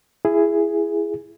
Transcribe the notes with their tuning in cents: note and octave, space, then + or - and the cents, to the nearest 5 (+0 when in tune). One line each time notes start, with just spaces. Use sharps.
E4 +20 G#4 +0